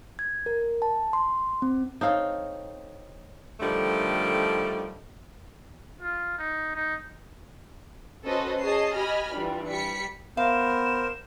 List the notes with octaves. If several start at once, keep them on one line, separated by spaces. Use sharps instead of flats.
G#6
A#4
A5
C6
C4
C4 D#4 A4 C#5 F5
D3 D#3 F3 G3 A3
F4
D#4
D#4
C#4 F#4 A4 B4 C5 D#5
G#4 C#5 D#5 A5 C7
G4 D#5 G#5 B5 F6
E3 G3 D4 F4
G3 B6 C#7
B3 A#4 C5 F5 E7